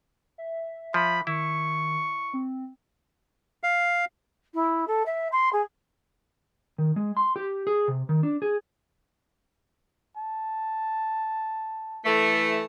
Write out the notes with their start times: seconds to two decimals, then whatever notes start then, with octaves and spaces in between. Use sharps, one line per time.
0.38 E5
0.94 F3 B5
1.27 D#3 E4 C#6
2.33 C4
3.63 F5
4.54 E4
4.87 A4
5.06 E5
5.32 C6
5.52 G#4
6.78 D#3
6.96 G#3
7.17 C6
7.36 G4
7.67 G#4
7.88 C3
8.09 D#3
8.23 D4
8.42 G#4
10.17 A5
12.05 E3 A3